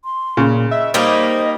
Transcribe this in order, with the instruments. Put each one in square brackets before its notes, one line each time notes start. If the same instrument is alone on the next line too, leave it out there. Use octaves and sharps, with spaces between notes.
[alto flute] C6
[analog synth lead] A#2 [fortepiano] C#3
[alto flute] D#5 [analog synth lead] E5
[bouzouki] G3 A#3 D#4 [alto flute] C5 [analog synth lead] D#5